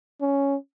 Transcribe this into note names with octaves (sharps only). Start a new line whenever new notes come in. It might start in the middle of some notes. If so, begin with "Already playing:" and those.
C#4